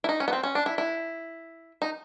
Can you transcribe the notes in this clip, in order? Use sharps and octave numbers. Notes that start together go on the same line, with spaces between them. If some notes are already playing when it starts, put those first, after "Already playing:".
E4
D#4
C#4
B3
C4
C#4
D4
E4
E4
D#4